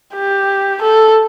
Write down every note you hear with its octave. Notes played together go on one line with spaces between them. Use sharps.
G4
A4